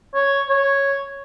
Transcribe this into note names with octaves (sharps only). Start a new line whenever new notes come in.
C#5
C#5